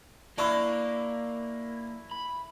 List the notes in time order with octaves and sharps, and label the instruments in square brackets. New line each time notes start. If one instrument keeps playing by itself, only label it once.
[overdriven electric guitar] A#3 [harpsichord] D4 [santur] E4 C#6
[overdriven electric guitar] B5